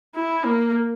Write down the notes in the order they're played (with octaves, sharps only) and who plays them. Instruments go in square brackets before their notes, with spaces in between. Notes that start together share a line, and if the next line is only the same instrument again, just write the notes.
[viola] E4
A#3